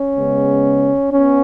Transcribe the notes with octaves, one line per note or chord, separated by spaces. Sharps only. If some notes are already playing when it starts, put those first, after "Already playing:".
Already playing: C#4
C#3 G#3 B3
B3 C#4